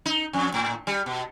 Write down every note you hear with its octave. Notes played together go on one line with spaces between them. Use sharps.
D#4
F2
A2
G3
B2